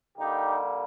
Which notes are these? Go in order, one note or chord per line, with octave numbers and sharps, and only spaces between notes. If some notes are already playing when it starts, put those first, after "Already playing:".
D3 G3 A#3 D#4 G4